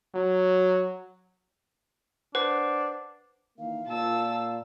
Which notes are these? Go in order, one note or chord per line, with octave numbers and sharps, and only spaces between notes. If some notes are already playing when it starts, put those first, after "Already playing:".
F#3
D4 B4 C5 F#5 C7
D#3 E3 A#3 F5
A#2 A5 E6